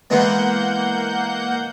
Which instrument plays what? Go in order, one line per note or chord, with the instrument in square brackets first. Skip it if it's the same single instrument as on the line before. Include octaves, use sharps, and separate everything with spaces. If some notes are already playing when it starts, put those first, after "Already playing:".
[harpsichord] E3 G#3 B3 [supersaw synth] A#3 F#5 G6